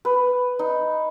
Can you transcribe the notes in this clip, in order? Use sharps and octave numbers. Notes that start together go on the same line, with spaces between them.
B4
D#4